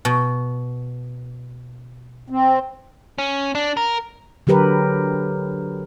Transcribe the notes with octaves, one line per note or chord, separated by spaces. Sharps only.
B2
C4
C#4
D4
A#4
D3 F#3 G4 A#4 B4